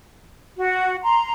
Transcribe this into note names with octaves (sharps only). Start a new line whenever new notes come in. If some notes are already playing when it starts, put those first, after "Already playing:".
F#4
A#5 C6